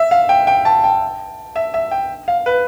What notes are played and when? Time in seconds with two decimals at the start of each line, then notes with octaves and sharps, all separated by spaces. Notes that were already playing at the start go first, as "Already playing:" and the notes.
Already playing: E5
0.11 F5
0.29 G5
0.47 G5
0.65 A5
0.84 G5
1.56 E5
1.74 E5
1.91 G5
2.28 F5
2.46 B4